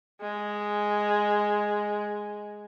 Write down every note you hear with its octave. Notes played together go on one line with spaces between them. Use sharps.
G#3